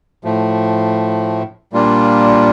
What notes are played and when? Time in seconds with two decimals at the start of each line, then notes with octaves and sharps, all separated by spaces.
0.24 A2 F3 A3
1.73 A#2 G3 A#3 D4 F4